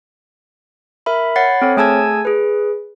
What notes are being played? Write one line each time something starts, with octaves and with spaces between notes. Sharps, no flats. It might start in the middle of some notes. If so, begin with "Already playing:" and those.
A#4 E5 B5
C#5 F#5 B5 A6 C7
C4 A4 C#5
A3 G#4 G#5 A5 E6 G#6
G#4 B4